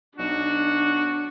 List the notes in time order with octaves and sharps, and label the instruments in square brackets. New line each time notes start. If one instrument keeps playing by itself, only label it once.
[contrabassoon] B1 [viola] D4 [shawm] F#4